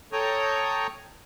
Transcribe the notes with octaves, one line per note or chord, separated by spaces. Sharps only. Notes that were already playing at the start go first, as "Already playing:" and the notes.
A4 C#5 G5 A#5 C#6 D#6